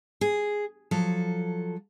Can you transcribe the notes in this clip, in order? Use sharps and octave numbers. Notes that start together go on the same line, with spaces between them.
G#4
F3 F#3 A4